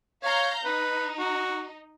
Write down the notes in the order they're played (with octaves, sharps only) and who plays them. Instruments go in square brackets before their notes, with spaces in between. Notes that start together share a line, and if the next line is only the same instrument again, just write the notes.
[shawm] C#5 [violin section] F5 A#5 G6
[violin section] D#4 [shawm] B4
[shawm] F#4